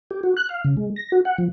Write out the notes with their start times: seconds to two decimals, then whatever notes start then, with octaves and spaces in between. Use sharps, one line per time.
0.11 G4
0.23 F#4
0.37 F#6
0.49 F5
0.64 C#3
0.77 G#3
0.96 A#6
1.12 F#4
1.25 F#5
1.38 F3